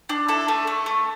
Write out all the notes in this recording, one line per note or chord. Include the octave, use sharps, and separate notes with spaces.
D4
E4 A4
A3
A3
A3